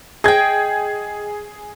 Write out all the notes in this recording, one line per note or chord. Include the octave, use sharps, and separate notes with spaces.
G#4 D#5 G5 G#6